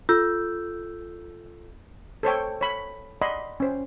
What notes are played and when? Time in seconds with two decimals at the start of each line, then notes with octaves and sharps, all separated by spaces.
0.09 F4 A4 E6 G6
2.23 A4 C5 C#5 G5
2.61 C#5 B5
3.21 D5 D#5 F#5 B5 C6
3.60 C#4 C5